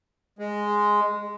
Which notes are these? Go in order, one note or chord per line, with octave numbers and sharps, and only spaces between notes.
G#3